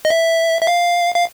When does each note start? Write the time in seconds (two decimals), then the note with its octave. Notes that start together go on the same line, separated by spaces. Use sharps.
0.05 D#5
0.10 E5
0.61 E5
0.67 F5
1.14 F5